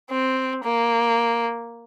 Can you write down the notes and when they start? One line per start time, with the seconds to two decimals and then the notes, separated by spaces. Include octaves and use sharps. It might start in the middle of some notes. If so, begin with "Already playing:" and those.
0.10 C4
0.64 A#3